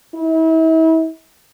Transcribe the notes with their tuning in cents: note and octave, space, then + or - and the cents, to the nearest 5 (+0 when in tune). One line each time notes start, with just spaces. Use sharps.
E4 -40